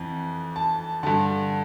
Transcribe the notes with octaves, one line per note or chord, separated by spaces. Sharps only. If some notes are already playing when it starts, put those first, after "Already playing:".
Already playing: F2 E3
A5
G2 D3 A5